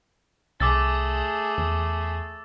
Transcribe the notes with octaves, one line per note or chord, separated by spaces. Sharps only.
C2 A3 G#4 D6 E6 A6
E2